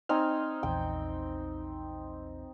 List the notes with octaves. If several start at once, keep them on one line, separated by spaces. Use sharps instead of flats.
C4 D#4 G#5 F6
A#1 E2 G5